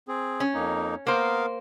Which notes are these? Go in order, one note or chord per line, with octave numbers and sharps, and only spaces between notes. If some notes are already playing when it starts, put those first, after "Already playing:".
C4 G#4
C#4
F2 A#3 D#4
A#3 B3 A#4 C5 F5